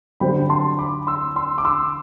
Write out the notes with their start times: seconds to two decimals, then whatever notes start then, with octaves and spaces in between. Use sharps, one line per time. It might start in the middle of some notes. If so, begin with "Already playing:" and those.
0.20 D3 F#3 C4 G4 C5 G5 B5
0.49 A5 C6
0.79 B5 D6
1.07 C6 E6
1.36 C6 E6
1.58 D6
1.65 C6 E6